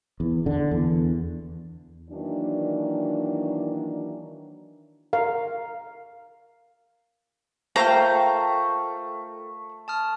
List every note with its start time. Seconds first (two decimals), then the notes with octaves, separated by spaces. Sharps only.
0.20 E2
0.46 D3
0.71 E2
2.10 D#3 E3 F#3 A#3 D4
5.13 A#4 F5
7.76 A3 F4 A4 A#4 C5 F5 G5 A#5
9.88 A5 D#6 F6